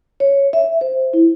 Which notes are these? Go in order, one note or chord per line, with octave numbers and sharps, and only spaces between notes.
C#5
E5
C5
E4